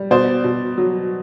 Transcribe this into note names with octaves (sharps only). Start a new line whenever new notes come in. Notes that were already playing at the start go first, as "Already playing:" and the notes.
Already playing: G3
B2 C5 D5
B2
F#3